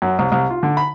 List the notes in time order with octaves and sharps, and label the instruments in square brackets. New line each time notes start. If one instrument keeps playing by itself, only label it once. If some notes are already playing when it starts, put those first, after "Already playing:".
[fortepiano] F#2
C2
C2
F4
D3
B5